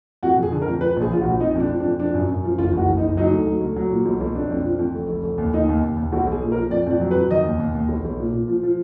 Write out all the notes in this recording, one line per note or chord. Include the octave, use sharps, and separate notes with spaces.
F2 F#4
F2
G#4
D3
A#4
F2
F3 B4
A#1 G#4
A#1 F4
F#4
A#1
F2 D#4
F2 D4
F3
D4
F2
F3 D4
F#2
F#2
F3
F#1 F4
F#1 F#4
F#1
D#4
F#1
F#3 D#4
D2
F#3
D2
F#3
A#2
B1
B1
F2 D4
F2
F3
F2
F1
F1
F1
D#2
D#2 D#4
D#2
D#2
D#2
B1 F#4
B1 G#4
A#2
A#4
F3
F2 D5
F2 D5
F#3
B4
F2
D#3 D#5
D#2
D#2
D#2
B1
B1
A#2
A#2
F3
F3